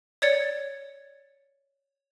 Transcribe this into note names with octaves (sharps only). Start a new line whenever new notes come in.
C#5 D5 G#6 A6 C#7